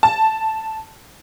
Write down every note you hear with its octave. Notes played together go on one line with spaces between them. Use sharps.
A5